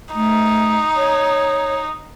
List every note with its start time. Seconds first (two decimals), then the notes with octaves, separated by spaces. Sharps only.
0.15 A3 D#4
0.96 C#5